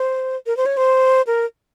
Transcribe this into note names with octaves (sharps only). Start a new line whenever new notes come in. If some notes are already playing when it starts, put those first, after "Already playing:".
Already playing: C5
A#4
C5
C#5
C5
A#4